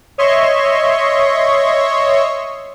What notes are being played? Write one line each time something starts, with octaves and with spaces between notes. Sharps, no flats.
C#5 D#5 E5 C6 C#6